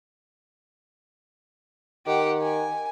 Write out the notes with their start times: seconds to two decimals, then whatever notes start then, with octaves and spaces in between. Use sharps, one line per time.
2.07 D#3 G4 F#5
2.42 G#5